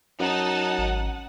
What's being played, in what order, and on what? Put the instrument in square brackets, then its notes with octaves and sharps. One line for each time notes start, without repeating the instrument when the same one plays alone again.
[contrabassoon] F#2 [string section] D#4 A5 [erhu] F#5
[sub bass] G#1